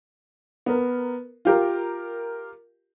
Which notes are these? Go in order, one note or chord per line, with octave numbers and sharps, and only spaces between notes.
B3 A#4
F4 G4 A#4